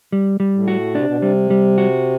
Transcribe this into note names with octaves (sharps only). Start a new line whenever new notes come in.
G3
G3
A2
F#4
C3 D4
B2
C3
G3
G3
F#4